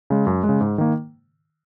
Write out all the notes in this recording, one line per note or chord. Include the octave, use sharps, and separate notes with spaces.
C#3 G#3
F#2
G#3
C#3
G#2
D#3 A#3